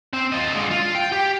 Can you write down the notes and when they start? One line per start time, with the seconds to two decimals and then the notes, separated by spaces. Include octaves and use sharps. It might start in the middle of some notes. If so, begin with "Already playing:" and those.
0.13 C4
0.32 F4 D#5
0.52 D3 G#3
0.71 F4
0.95 G5
1.12 G4